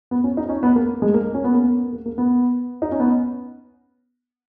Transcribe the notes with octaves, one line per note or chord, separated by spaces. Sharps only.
B3
C#4
D#4
C#4
B3
A#3
G#3
A#3
C#4
B3
A#3
B3
A#3
A#3
B3
D#4
C#4
B3